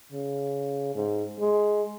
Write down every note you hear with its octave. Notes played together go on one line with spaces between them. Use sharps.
C#3
G#2
G#3